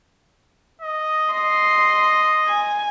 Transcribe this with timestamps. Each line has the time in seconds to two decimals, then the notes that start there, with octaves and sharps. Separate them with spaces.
0.81 D#5
1.33 D#5 C6
2.47 G#5